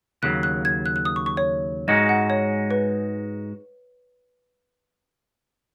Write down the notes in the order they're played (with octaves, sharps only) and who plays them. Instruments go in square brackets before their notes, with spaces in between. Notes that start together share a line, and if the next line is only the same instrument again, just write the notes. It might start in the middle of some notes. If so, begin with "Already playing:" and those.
[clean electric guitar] D#2 C#3 F#3 [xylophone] F#6
[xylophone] F#6
G#6
F#6
F#6
D#6
C#6
C#6
C#5
[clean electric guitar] G#2 G#3 D#4 F#4 [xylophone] D#5
[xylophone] F#5
C#5
B4